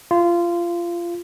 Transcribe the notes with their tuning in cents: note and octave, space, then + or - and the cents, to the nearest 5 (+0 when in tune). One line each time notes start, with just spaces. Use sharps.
F4 -20